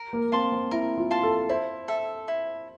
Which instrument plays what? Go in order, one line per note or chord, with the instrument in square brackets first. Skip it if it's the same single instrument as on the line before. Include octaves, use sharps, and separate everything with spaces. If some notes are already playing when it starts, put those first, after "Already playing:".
Already playing: [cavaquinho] A#4
[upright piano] A#3
[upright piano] C4 [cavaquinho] F5 A5 C6
[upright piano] C4
[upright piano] E4 [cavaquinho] A#4
[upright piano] F4
[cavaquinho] F5 A5 C6
[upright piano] A4
[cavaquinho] E4 [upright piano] C5
[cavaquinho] A4 E5
E4